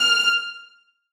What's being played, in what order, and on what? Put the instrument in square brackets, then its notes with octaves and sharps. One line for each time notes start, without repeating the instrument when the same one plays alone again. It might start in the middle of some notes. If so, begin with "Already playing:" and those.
Already playing: [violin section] F6